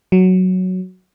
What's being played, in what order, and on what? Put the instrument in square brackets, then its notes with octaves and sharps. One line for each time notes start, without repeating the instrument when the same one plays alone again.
[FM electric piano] F#3